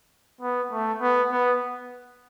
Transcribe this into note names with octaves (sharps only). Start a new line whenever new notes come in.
B3
A3
B3
B3